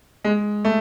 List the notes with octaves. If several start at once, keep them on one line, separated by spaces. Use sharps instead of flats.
G#3
A3